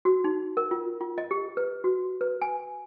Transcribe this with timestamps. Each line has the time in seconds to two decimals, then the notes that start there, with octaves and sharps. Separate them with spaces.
0.05 F#4
0.24 D#4
0.57 A#4
0.71 F4
1.01 F4
1.18 D#5
1.31 G4
1.57 B4
1.84 F#4
2.21 B4
2.42 G#5